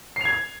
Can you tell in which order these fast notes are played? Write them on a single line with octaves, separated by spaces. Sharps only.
C7 F7 G#6